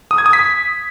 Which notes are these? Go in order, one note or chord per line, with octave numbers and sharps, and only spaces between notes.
D#6
G#6
D#6
B6